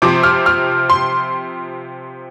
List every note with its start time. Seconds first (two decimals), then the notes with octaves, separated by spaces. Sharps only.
0.02 C3 F3 C4 D6
0.23 F6
0.46 F6
0.90 C6